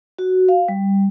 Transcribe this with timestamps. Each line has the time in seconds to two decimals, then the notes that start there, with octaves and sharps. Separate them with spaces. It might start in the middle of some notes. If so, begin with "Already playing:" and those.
0.19 F#4
0.49 F5
0.68 G3